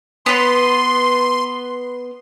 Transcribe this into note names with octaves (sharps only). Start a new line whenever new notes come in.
B3 B4 C6